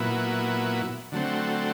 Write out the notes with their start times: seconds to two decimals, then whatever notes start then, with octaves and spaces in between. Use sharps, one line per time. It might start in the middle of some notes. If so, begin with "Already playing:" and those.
Already playing: A#2 F#3 B3 E4
1.12 D3 F#3 A3 C4